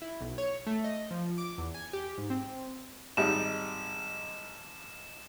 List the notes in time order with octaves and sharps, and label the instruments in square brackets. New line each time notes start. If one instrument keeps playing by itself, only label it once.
[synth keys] E4
B1
C#5
A3
D#5
F3
D6
E2
G#5
G4
G#2
C4
[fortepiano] G#1 G3 D#4 [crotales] E7